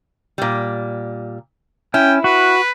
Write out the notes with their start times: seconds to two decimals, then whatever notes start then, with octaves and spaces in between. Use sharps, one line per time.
0.38 A#2 G3
1.94 C#4 E4 G5
2.24 F#4 B4